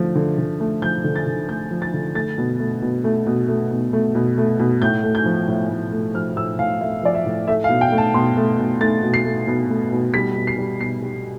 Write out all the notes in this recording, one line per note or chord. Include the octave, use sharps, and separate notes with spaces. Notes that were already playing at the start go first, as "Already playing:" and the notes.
Already playing: D3 F3 A3
D3
D3
A3
F3 G6
D3
A6
D3
A3 G6
F3
A6
D3
A3 A6
B2
A3
B2
A3
B2
A3
B2
A3
B2
A3
B2
A2 G6
A3
G6
F3
A2
A2
A3
F3 F6
A2 E6
A2 F5
A3 E5
F3 D5
E5
A2
A3 E5
F5
B2
G5
A3
A5
B2 C6
A3
B2
A3 A6
B2
C7
A3
B2
A3
B2
G3 B6
B2
C7
G3
B2 C7
G3